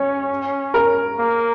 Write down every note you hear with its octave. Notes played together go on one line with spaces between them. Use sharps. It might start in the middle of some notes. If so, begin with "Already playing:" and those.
Already playing: C#4 C#5
A#4
A#3